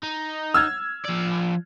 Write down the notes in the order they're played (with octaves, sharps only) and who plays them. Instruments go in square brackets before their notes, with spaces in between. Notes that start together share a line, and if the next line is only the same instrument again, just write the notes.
[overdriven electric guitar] D#4
[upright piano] E6 F6 G#6
[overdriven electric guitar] F3 D5